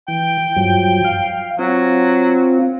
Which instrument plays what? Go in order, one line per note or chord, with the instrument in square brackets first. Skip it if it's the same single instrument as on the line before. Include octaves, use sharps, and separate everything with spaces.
[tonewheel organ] E3 [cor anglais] G5
[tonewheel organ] G2 F3 F#3
F5
[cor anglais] F#3 [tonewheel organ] C4 F4